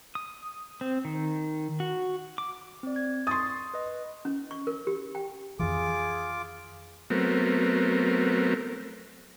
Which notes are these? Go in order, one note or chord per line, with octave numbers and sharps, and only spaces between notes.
D#6
C4
D#3
F#4
D6
C4 D5
G#6
C6 C#6 D#6 A6
B4 D#5
C#4
C#6
A#4
G4
G5
F2 D#3 E3 F4 G#4 D6
F#3 A3 B3 C4 A#4